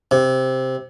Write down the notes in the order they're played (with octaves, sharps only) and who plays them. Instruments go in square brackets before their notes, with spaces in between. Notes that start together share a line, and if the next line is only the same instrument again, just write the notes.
[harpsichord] C3